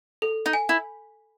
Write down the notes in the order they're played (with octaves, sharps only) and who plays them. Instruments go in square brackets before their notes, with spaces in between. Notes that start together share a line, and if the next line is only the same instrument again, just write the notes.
[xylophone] A4
[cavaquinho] D#4
[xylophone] G#5
[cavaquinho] E4